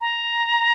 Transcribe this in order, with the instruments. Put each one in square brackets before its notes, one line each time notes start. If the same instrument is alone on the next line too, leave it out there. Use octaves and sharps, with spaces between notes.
[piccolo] A#5